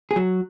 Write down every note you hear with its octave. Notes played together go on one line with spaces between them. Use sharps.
G#4
F#3 F#4